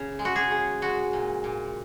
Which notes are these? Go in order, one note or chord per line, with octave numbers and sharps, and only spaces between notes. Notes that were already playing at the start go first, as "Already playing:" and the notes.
Already playing: C#3
G#3
F#4
G#4
C#3
G#3 F#4
A#2
A#2